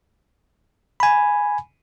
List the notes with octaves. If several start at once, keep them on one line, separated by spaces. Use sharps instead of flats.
G#5 B5